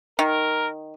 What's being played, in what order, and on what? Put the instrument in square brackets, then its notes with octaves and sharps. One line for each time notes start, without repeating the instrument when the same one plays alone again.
[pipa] D#3 [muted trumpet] A#4